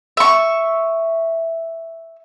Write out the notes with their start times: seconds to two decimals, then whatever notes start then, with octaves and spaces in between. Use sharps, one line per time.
0.17 E5 C#6